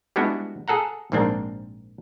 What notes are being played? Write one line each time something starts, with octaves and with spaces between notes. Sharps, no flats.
G3 G#3 B3 D4 E4 F#4
G#4 A4 F#5 A#5
A#1 G#2 A#3 C4 D4 G5